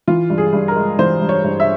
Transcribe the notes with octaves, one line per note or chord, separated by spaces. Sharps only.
E3 F4
G2
G#4
G2
A#4
G#3
E3 C5
G2
C#5
G2
E5